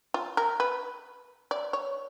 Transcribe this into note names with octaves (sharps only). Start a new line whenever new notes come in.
F4
A#4
B4
D5
C#5